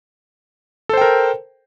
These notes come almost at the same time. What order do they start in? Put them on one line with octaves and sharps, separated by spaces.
A4 C5 G5 A#4